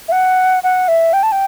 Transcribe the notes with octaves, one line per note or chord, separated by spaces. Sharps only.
E5
F#5
F#5
E5
G5
A5
G5